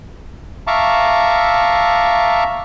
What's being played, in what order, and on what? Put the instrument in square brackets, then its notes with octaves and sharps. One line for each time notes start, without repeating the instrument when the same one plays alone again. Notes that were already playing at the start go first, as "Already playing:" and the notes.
[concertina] E5 F5 A5 A#5 C#6 D6